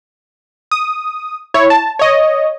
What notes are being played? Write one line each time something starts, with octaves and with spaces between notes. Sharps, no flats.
D#6
E4 C#5
A5
C#5 D#5